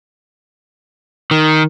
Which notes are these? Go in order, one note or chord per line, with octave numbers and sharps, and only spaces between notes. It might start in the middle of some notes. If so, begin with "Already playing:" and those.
D#3